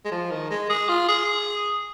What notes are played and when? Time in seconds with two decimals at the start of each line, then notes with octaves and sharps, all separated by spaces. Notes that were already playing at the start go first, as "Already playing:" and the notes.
0.05 G#3
0.11 F3
0.31 D#3
0.51 G#3
0.70 G#4
0.89 F4
1.09 G#4